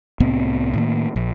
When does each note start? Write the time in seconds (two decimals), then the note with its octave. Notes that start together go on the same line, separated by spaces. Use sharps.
0.20 C2 A2 B3 C4
0.74 A2 D#3 A#3
1.16 A#1